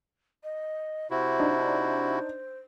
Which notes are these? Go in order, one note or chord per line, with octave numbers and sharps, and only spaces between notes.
D#5
C3 E4 F#4 C5
D4 D#4